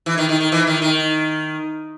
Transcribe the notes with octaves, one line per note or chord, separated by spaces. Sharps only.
E3
D#3
D#3
D#3
E3
D#3
D#3